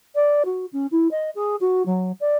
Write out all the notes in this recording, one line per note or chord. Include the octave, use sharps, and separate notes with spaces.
D5
F#4
C#4
E4
D#5
G#4
F#4
F#3
D5